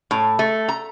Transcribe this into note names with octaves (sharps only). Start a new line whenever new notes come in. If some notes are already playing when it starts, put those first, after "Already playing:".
A2
A3
A#5